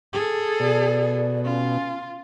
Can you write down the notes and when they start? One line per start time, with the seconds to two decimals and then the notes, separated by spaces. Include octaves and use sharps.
0.13 G#4 A4
0.60 B2 D5
1.45 C#4 F4